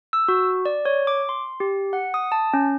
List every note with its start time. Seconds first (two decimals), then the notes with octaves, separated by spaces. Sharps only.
0.13 E6
0.28 F#4
0.66 D5
0.85 C#5
1.07 D6
1.29 C6
1.60 G4
1.93 F#5
2.14 D#6
2.32 A5
2.53 C#4